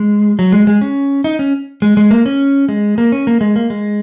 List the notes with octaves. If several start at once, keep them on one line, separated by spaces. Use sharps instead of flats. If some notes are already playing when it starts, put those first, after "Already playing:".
Already playing: G#3
F#3
G#3
G#3
C#4
D#4
C#4
G#3
G#3
A#3
C#4
G#3
A#3
C#4
A#3
G#3
A#3
G#3